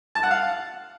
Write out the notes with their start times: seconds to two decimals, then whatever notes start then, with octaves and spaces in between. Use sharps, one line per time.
0.15 A5
0.23 F#5
0.31 F5